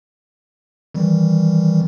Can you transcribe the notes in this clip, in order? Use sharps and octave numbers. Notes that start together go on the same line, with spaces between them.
D#3 E3 G3